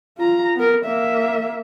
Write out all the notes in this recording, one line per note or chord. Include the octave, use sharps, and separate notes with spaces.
F4 A#5
B3 A#4
A#3 E5